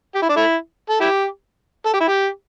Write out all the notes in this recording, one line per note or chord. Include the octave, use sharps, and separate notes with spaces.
G4
E4
D4
A3 E4
A4
E4 G4
A4
G4
E4
G4